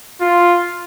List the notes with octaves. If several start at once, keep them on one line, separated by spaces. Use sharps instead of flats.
F4